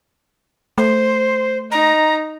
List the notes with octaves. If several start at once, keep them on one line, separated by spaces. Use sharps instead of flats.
A3 C5
D#4 A#5